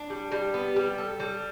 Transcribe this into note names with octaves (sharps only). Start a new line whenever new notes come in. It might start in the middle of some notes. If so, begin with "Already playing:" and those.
Already playing: D4
G3
G3
B3
G3
A4
G3